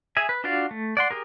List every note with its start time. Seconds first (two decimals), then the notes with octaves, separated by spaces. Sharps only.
0.17 G#4 E5 G#5
0.29 B4
0.44 D4 F4 F#4 D5 F5
0.71 A3
0.97 D5 F#5 C6
1.11 G4 G#4 A#4